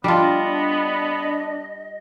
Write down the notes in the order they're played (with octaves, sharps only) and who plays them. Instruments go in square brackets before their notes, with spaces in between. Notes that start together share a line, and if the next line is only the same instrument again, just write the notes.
[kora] G3 F4 [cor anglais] B3 [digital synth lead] D4 [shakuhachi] D#5